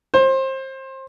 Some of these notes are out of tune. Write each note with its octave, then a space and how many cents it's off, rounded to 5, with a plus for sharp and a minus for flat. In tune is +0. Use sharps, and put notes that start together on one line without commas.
C5 +25